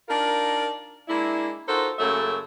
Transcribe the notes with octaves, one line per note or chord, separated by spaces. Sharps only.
D4 D#4 F4 A#4
G#3 A#3 D4 E4
D#4 F4 F#4 A4 A#4 C5
F#2 C#3 F#3 A3 A#3 E5